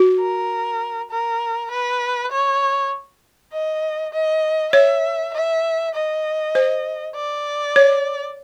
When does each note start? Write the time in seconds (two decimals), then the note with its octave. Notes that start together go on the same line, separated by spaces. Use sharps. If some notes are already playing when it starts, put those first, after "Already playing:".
Already playing: F#4
0.20 A#4
1.11 A#4
1.71 B4
2.32 C#5
3.53 D#5
4.13 D#5
4.73 C#5 E5
5.34 E5
5.94 D#5
6.55 C5
7.15 D5
7.76 C#5